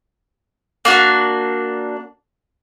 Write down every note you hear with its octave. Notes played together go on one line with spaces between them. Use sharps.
A#3 D4 F#4